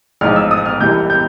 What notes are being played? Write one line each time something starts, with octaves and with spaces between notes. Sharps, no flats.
A1 G#2 F3 F6
E6
D#6
F6
C2 C3 E3 G6
G6